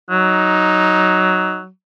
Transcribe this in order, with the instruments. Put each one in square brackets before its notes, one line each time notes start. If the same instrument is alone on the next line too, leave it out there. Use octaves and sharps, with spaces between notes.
[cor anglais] F#3 [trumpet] D#4